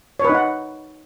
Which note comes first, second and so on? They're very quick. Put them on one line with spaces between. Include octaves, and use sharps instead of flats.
C#5 B4 D#4 F#5